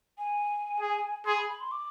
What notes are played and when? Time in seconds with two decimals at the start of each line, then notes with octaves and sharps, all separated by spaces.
0.18 G#5
0.80 G#4
1.26 G#4 C6
1.37 B5
1.50 B5
1.60 C6
1.71 D6